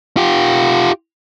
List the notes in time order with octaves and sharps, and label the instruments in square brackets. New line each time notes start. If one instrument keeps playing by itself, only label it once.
[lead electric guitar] F4 G4